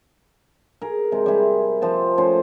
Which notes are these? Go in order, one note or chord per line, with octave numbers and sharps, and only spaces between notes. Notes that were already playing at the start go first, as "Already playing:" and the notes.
G#4 A#4
C3 G#3
G3 C4 E4 G#4
F3 C4 A5
F3 A3 C#4 C5